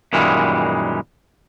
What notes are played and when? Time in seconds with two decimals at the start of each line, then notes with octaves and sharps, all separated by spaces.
0.13 F#2 A#2 D#3 E3 G3 G#3